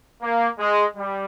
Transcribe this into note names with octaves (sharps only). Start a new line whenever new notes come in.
A#3
G#3
G3